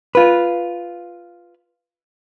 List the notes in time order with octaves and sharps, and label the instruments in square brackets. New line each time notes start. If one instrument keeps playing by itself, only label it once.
[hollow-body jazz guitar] F4 B4